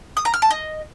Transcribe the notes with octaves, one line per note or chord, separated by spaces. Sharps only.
D#6
A#5
F6
A5
D#5